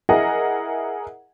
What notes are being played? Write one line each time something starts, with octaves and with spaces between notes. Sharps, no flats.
E4 G#4 A#4 D#5 F#5